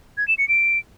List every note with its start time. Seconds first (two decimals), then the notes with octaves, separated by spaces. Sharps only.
0.17 G#6
0.28 E7
0.38 C#7
0.49 D7